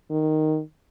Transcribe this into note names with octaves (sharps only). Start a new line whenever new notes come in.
D#3